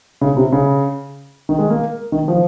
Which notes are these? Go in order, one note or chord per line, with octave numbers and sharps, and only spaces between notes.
C#3
C3
C#3
D#3
G#3
A#3
D#3
F3